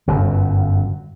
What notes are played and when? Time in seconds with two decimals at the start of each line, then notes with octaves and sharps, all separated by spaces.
0.07 G1 F#2